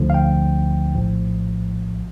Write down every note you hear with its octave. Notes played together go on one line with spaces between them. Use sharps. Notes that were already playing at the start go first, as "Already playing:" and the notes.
Already playing: D2 D3 F3
F5
G5
A#1 A2 F3